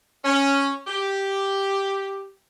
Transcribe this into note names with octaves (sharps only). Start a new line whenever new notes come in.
C#4
G4